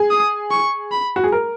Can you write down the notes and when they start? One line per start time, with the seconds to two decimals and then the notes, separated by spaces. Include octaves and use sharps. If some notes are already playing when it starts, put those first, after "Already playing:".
Already playing: G#4
0.10 D#6
0.51 C#6
0.91 B5
1.16 F#4
1.24 G#4
1.32 A#4